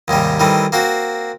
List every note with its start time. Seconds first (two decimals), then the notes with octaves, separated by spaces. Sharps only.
0.08 D#2 G#2 C3 G3
0.40 D#3 E3 G3 A3 C4
0.72 A#3 C4 F#4